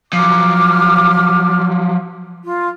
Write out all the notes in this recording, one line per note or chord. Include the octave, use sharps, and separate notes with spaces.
F3 F#3 D6 F6
F4